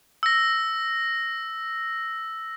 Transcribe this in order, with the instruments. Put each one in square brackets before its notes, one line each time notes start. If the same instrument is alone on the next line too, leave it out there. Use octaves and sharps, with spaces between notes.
[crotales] E6 A#6